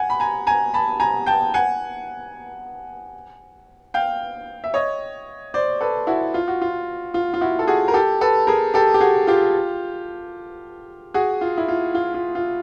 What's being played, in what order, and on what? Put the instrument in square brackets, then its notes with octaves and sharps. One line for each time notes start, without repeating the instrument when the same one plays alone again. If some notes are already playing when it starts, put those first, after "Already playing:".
Already playing: [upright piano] F#5 G#5
B5
G#5 A#5
G#5 A#5
A5 B5
G#5 A#5
G5 A5
F#5 G#5
F5 G5
E5
C#5 D#5
C5 D5
A4 B4
E4 F#4
F4
F#4
F4
F4
F4
E4 F#4
A4
F#4 G#4
A#4
G4 A4
A4 B4
G#4 A#4
G4 A4
G4
F#4 G#4
F4 G4
F#4 G#4
F4
E4
F4
F4
F4
F4